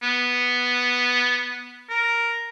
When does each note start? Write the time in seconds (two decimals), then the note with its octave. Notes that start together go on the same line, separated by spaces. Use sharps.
0.03 B3
1.90 A#4